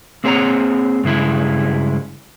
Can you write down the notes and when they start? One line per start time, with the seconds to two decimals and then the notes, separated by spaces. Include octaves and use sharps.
0.24 A#3 C4 G#4 C#5 F#5 A#5
1.04 G2 C#3 G#3 E4